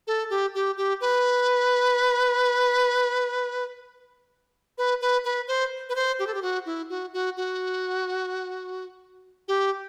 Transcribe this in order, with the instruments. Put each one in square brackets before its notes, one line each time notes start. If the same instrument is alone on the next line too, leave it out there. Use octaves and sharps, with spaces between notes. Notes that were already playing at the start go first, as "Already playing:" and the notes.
[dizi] A4
G4
G4
G4
B4
B4
B4
B4
C5
B4
C5
G4
A4
G4
F#4
E4
F#4
F#4
F#4
G4